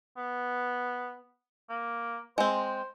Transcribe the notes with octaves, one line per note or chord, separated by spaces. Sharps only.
B3
A#3
G#3 C4 C5